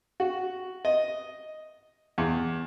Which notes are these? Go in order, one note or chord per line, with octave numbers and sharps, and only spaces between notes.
F#4
D#5
E2